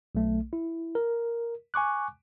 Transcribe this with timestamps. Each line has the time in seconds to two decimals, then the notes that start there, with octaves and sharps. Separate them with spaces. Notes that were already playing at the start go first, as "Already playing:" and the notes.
0.15 B1 A3
0.53 E4
0.95 A#4
1.74 G#5 C#6 D6 F#6